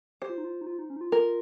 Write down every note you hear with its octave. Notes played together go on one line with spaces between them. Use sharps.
G4 C5
F4
D#4
F4
D#4
F4
D#4
C#4
D#4
F4
A#4